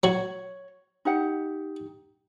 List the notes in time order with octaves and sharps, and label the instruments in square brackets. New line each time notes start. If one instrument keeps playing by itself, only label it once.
[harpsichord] F#3 F#4 [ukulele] C#5
[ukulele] D#4 G4 F#5